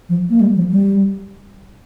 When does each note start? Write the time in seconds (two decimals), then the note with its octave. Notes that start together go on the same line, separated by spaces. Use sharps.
0.09 F3
0.30 A#3
0.40 G3
0.56 F3
0.71 G3